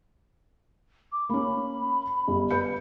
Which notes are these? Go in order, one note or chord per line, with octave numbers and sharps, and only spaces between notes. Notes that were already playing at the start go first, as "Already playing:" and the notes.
D6
A#3 C#4 B5
G1
B4 G6 C#7